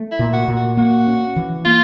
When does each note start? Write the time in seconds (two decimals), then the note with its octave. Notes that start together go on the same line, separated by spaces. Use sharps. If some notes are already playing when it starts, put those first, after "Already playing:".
Already playing: A3
0.12 E4
0.19 A#2
0.33 F#4
0.48 A#2
0.56 F#4
0.77 A#3 F#4
1.07 C#4
1.36 E3
1.65 A#3 F4